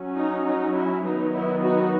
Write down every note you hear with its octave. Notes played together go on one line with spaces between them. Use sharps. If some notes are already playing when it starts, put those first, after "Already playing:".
Already playing: F#3 C#4
D#4
D#4
E4
D#3 F#3 B3 D#4
E4
D#4 F#4